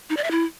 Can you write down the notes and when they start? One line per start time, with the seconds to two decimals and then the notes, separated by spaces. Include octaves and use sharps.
0.10 D#4
0.17 D5
0.24 E5
0.31 E4